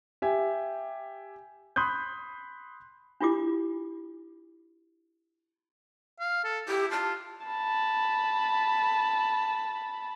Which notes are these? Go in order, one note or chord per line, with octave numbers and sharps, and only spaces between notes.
G4 E5 G#5
B5 C6 D#6 F#6 G6
D4 E4 F4 G4 D6
F5
A4
E4 G4
F4 A5
A5 B5